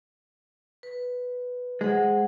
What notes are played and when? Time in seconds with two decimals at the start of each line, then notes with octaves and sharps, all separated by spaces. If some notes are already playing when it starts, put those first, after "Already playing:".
0.83 B4
1.81 G#3 C5 F#5